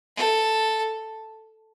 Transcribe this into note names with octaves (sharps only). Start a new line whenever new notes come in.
A4